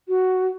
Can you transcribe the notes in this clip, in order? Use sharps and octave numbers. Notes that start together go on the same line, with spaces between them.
F#4